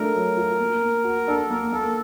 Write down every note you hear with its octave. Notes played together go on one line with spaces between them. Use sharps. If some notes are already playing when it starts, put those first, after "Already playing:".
Already playing: A3 D4 F4 A#4
F#3
F4
A#3
A#3
F#4
D4 A4
A#3 A#4
A#3 A4